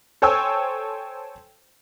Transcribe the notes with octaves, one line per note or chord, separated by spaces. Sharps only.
A4 C5 C#5 G5 G#5 E6